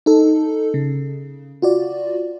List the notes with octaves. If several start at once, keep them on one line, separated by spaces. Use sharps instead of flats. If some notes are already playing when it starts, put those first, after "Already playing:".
D#4 A4
C#3
F4 F#4 D5